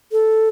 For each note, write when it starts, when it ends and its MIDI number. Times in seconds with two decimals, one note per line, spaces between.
0.12 0.49 69